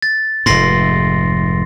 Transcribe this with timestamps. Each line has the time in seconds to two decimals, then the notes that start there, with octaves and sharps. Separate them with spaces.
0.02 A6
0.46 F1 G#2 C6 A#6 C7